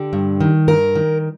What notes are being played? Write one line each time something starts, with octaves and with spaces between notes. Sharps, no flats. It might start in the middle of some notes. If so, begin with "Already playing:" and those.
Already playing: D3 G4
G2
D#3
G2 A#4
D#3